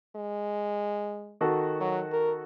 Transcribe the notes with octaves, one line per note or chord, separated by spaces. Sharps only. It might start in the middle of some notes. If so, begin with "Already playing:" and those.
G#3
D#3 F#4 A4
F#3
A#4